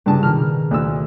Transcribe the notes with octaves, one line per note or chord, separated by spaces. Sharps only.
G2 C#3 D4 G#4 A5
B2 D#3 F6
D2 E6 F#6 A6